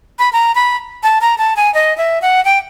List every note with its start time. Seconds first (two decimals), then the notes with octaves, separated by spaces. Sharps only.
0.19 B5
0.33 A#5
0.55 B5
1.03 A5
1.21 A#5
1.38 A5
1.56 G#5
1.74 D#5
1.98 E5
2.22 F#5
2.45 G5